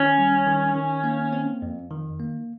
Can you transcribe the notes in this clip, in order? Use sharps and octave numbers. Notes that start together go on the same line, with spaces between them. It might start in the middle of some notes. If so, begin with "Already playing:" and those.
Already playing: D#3 C#4
G3
D#3
D#3
A#3
C4
F2
D#3
A#3